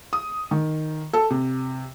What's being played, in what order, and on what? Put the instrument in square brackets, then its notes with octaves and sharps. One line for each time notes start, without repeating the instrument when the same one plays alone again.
[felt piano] D#6
D#3
A4
C3